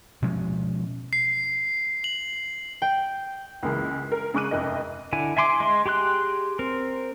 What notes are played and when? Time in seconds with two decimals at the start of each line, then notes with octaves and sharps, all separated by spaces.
0.22 B2 F3 G#3 C#4
1.13 C7
2.04 F#7
2.82 G5
3.63 C#2 C#3 E3 G#3 A#3
4.12 A#4
4.34 C#3 G#3 C#6 D6 F#6 D#7
4.51 F1 F2 E4 A#4 D#5
5.13 D3 E4 G#5
5.37 E5 G#5 C6 D6
5.60 G#3 C6
5.86 G4 G#4 C6 F#6
6.59 C4 A#4